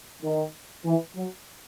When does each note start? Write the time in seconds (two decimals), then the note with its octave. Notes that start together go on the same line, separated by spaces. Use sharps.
0.23 D#3
0.85 E3
1.16 F#3